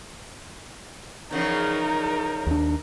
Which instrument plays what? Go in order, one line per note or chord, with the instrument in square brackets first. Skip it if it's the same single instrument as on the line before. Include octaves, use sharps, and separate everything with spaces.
[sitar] E2 C#3 F3 [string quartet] D#4 A#4
[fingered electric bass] D#2 D4